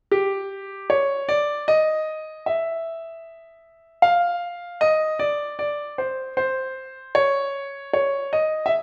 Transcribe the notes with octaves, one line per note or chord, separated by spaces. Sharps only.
G4
C#5
D5
D#5
E5
F5
D#5
D5
D5
C5
C5
C#5
C#5
D#5
E5